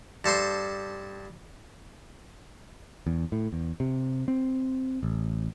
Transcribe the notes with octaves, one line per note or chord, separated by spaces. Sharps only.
G2 A4 C5 C6
E2
A2
E2
C3
C4
A1